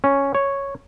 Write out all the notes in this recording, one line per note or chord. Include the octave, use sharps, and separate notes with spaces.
C#4
C#5